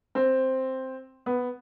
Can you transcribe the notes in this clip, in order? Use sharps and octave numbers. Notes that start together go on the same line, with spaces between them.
C4
B3